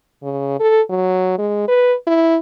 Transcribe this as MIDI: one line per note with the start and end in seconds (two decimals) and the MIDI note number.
0.23 0.56 49
0.60 0.81 69
0.90 1.36 54
1.38 1.64 56
1.68 1.94 71
2.07 2.39 64